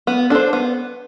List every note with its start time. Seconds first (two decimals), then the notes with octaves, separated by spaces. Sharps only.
0.07 B3
0.30 D4 A4 C5
0.53 B3